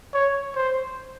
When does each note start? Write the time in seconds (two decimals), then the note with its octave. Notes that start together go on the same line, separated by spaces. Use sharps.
0.14 C#5
0.56 C5